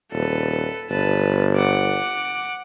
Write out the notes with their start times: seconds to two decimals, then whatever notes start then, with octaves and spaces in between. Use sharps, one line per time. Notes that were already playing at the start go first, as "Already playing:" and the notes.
0.12 D#1 A4 B4
0.90 G1 B4 A5
1.56 F#5 D6